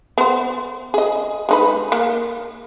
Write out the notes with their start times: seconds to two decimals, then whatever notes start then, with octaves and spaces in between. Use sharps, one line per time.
0.18 B3 C5
0.94 G#4 D#5
1.49 G#3 D#4 B4
1.92 A#3